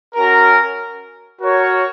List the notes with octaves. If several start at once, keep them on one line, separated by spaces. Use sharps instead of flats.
C#4 F#4 A#4
F#4 A#4 C#5